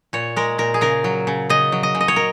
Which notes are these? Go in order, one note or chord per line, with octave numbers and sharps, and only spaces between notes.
A#2 C#5
G#3 A#4
A#2 A#4
G#4
C#3 A#4
F#3
C#3
C#3 D#5
F#3
D#5
C#3
D#5
C#5
A#4